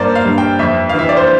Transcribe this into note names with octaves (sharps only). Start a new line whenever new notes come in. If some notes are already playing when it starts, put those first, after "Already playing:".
Already playing: G2 A#3 C5 D5
F5
G2
G5
F2 E5
E3 F5
E5
D5
C5